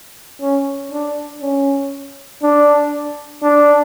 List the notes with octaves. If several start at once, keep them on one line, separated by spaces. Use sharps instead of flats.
C#4
D4
C#4
D4
D4